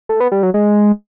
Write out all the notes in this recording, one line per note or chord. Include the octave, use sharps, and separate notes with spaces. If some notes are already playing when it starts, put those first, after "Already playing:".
A3
B3
G3
F#3
G#3